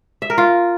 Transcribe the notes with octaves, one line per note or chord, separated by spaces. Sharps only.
E5
A#4
F4